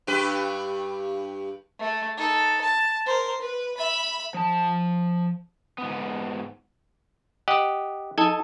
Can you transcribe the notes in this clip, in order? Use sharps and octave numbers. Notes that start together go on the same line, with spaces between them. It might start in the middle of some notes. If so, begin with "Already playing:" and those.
G2 G4 B4
A3
D#4 A4
A5
A#4 C5
B4
E5 B5
F3 A5
G#2 B3
G4 D#5 F#5
D#4 A4 D#5 G#5